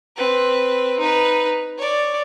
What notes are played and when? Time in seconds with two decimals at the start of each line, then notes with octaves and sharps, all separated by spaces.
0.16 C4 B4
0.99 D#4 B4
1.78 C#5 D5